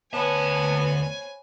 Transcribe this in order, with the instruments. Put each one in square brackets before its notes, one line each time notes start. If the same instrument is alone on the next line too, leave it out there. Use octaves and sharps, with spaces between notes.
[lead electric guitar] D2 A5 [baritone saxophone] B3 [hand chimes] C5 C#5 B5 [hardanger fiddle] G#5